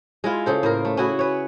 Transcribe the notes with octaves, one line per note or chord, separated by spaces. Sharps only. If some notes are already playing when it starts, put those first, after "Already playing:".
G#3 E4 F4
C#3 A4 C5
A2 A#3 A#4
A3
C#4 E4 F#4 G#4
B4 C#5